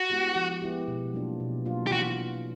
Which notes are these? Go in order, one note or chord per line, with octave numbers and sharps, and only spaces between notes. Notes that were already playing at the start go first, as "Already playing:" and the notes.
Already playing: F#4
G#3 B3 E4 G4
F3
G#3 B3 E4 G4
B2
F#3 A#3 D4 F4
B2
F#3 A#3 D4 F4
G4
E3 F#4